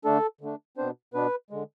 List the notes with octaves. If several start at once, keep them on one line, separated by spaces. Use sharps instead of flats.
D3 A3 D4 A4
D3 A3 D4
B2 B3 C4 D4 C5
B2 B3 D4 B4
D3 G#3